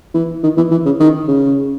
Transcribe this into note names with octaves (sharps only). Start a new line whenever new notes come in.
E3
D#3
E3
E3
C#3
D#3
C#3